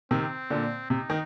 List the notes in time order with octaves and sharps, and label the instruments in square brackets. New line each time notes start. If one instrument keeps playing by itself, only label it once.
[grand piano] C3 D#3 [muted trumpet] C4
[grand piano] A#2 D3
[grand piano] C3 [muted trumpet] D#4
[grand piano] D#3